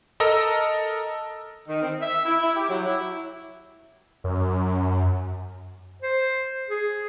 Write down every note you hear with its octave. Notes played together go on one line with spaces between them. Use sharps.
A4 A#4 D#5 A#5 E6
D#3
C4
E5
E4
E4
G4
F#3
E4
F#2
C5
G#4